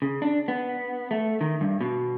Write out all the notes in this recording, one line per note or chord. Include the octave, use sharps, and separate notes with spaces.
C#3
D4
B3
A3
D#3
G2
B2